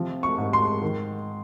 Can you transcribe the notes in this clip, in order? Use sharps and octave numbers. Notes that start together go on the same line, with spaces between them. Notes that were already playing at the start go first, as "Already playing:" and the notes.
Already playing: C3 F3
C#6
G#2
C6
D#3